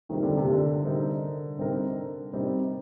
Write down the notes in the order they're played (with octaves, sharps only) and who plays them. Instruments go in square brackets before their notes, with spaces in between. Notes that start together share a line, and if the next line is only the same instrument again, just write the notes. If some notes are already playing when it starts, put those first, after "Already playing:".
[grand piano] C3 G3 C4 D#4 A#4 [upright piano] D#3
[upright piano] D3
C3
D3
[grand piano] C3 G3 C4 D#4 A#4
C3 G3 C4 D#4 A#4
C3 G3 C4 D#4 A#4